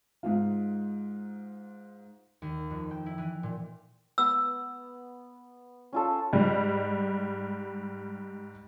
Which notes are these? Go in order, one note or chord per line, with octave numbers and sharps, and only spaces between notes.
G#2 D#4 F4
D#2
F2
G5
E4
E3
A#2
B3 E6
C#4 F4 A4
G#2 G3